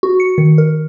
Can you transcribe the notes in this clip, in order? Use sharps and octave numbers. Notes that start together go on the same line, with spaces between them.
F#4
C#7
D#3
A#4